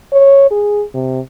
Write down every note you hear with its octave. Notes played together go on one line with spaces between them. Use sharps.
C#5
G#4
C3